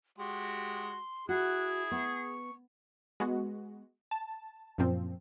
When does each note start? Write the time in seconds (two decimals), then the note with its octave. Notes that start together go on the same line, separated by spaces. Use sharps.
0.18 G#3 F#4 G4 C6
1.29 E4 F#4 G#4 F#6
1.91 B3 C#6
3.20 G#3 B3 F#4
4.11 A5
4.78 F#2 A#2 F3 C4